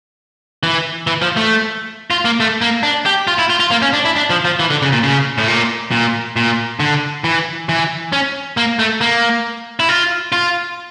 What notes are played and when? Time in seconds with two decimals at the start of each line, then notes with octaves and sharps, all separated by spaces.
0.63 E3
1.07 E3
1.22 F3
1.37 A3
2.11 F4
2.25 A#3
2.40 A3
2.62 A#3
2.83 D4
3.06 G4
3.28 F4
3.39 E4
3.50 F4
3.60 F4
3.71 A#3
3.82 C#4
3.93 D4
4.05 E4
4.16 D4
4.30 F3
4.45 F3
4.60 E3
4.70 D3
4.82 C#3
4.92 A#2
5.03 C#3
5.38 A2
5.48 A#2
5.91 A#2
6.36 A#2
6.80 D3
7.24 E3
7.69 E3
8.13 C#4
8.57 A#3
8.79 A3
9.01 A#3
9.80 E4
9.89 F4
10.32 F4